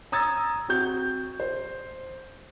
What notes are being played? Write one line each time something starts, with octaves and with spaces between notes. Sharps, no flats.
A#5 D#6 E6 G#6 A6
C4 F#4 G6
C5